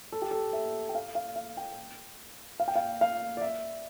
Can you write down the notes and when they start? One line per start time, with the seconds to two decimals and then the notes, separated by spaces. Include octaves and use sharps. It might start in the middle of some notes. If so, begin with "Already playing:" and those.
0.12 A4
0.22 G4
0.31 A4
0.53 E5
0.89 G5
0.95 F5
1.15 F5
1.36 F5
1.57 G5
2.60 F5
2.68 G5
2.76 F5
3.01 F5
3.37 D5
3.41 E5